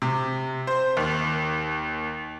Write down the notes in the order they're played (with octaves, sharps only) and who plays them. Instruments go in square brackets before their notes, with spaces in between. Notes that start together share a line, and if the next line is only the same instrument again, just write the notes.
[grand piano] C3
C5
D#2